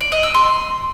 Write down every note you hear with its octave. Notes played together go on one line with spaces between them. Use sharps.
D5
D#5
E6
C6